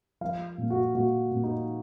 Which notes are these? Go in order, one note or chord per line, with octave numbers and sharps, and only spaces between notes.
F3 F5
A#2
F#4
A#2 F#4
A#2
D#4